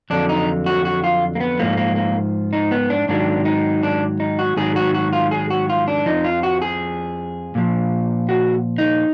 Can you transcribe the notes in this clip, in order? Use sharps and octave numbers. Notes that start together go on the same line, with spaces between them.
F2 D3 F#3 D4
D#4
F#4
F#4
F4
A#3
B3
G#2 F3 A#3
A#3
A#3
D#4
B3
D4
G#2 D#3 F#3 D4
D#4
D4
D#4
F#4
G#2 D#3 F#3 G#4
F#4
F#4
F4
G#4
F#4
F4
D4
F2 F3 D#4
F4
F#4
G#4
A#2 F3
F#4
D#4